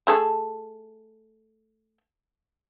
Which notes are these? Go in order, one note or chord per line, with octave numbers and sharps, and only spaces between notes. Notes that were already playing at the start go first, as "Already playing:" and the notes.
A3 G#4 A4